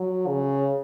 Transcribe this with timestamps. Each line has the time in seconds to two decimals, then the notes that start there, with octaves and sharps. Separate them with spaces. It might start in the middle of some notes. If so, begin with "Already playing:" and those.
Already playing: F#3
0.27 C#3